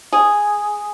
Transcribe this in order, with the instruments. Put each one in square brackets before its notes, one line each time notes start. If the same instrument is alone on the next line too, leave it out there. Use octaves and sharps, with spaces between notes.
[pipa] G#4